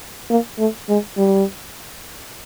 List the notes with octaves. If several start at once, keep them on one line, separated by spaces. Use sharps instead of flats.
A#3
A3
G#3
G3